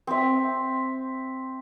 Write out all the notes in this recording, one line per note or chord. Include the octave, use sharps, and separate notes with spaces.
C4 E5